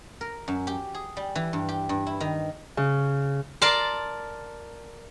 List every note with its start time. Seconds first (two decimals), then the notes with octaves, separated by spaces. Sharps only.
0.21 A#4
0.48 F#2
0.67 G4
0.95 G#4
1.17 G3
1.35 E3
1.53 G2
1.69 G4
1.89 G2
2.06 E4
2.20 D#3
2.77 C#3
3.62 A#4 D5 A5 C6